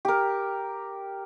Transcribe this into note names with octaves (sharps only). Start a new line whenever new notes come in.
G4 A#4